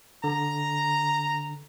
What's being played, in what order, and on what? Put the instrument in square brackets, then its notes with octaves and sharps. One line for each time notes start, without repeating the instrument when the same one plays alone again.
[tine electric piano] D3 [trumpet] A#5